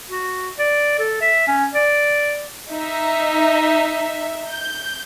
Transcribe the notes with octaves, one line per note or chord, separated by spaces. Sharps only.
F#4
D5
A4
E5
C#4
D5
D#4 E5
G6